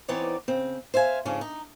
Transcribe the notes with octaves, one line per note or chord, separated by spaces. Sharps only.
E3 B3 C4 D#4 C#5 D5
C#3 C4
C5 E5 F5 G#5
F2 G#2 C#3 C#4 D4
D#4